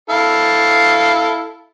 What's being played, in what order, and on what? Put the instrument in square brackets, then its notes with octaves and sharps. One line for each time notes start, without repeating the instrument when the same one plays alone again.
[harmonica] E4 A4 F5